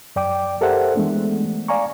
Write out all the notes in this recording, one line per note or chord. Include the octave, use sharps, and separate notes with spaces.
F#2 D5 G5 D6
G4 A4 A#4 C5 E5 F#5
E3 G#3 A3 B3 D4
D5 F5 G#5 A#5 C#6